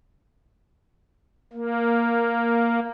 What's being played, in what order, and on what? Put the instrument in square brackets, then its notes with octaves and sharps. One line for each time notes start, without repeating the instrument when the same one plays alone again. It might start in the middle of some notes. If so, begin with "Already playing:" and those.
[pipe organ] A#3